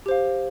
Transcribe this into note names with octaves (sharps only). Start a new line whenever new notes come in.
G4 C5 F5